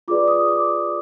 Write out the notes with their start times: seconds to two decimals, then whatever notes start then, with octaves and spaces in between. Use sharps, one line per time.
0.08 F4 G#4 B4 D5 D6
0.28 D#6
0.49 D6